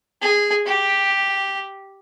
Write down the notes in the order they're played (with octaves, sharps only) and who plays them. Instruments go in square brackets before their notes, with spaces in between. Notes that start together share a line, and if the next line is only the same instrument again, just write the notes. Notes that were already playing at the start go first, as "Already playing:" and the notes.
[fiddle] G#4
G4